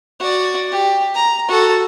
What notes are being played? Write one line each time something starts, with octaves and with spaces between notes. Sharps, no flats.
F#4 D5
G4
A#5
F#4 A4